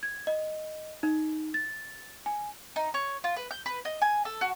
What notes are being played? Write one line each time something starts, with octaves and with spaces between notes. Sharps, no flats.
G#6
D#5
D#4
A6
G#5
D#4
C#5
F4
B4
G6
B4
D#5
G#5
A4
F#4